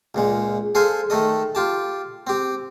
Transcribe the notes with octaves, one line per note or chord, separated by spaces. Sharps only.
C#2 A#2 G#3
G#4 A4 C5 F5 G#5
D#3 A3 A4 D#5
F4 G4 A5
C4 G4